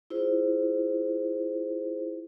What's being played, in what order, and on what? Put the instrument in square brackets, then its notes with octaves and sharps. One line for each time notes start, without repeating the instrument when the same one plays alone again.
[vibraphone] E4 F4 G#4 C5